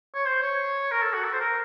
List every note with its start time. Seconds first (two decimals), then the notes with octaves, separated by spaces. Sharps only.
0.14 C#5
0.26 C5
0.42 C#5
0.91 A#4
1.02 A4
1.14 F#4
1.24 A4
1.33 C5
1.41 A#4